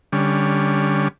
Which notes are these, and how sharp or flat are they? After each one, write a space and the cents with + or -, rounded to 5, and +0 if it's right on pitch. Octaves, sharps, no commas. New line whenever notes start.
D3 +0 G3 +15 C#4 +10